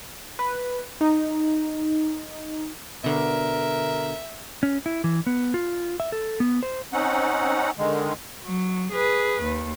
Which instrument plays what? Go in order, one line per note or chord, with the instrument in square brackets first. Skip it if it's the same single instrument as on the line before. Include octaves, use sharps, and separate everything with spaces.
[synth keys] B4
D#4
[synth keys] B2 D3 [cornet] A#4 [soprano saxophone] E5
[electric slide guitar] C#4
E4
E3
B3
F4
E5
A4
B3
C5
[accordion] C4 C#4 D#4 F#5
D3 D#3 G#3
[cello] F#3
G#4 B4
D#2